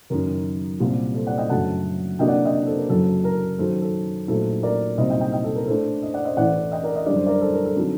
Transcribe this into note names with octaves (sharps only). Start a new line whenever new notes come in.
F#1 F#2 D#3 A#4
C2 A#2 G3 C4
A4 C5
D5 F#5
D#5 G5
F#1 F#2 D3 F#3 A3 F#5 A5
D2 C3 F#3 A#3 D4 D#5 G5
D5 F#5
D#5 G5
A4 C5
A#4
F#1 F#2 F#3 A4
A#4
F#2 D#3 F#3 A4 C5
A4
A#1 A#2 F#3 A3 D#4 A4 C5
A#4 D5
C2 A#2 F#3 C4 D#4 C5 D#5
D#5 G5
D#5 G5
D#5 G5
A4
A#4
A2 A3 D4 A4 C5
C5 D#5
D5 F#5
C5 D#5
A1 A2 A3 D5 F#5
D#5 G5
A#4 D5
D#5
F#2 D3 G3 D4 D5
C5
A#4 D5
A4 C5
A#4
A4
D3 F#3 C4 D#4